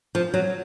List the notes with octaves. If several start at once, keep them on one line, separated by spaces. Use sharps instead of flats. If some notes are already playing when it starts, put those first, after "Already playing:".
F3
F#3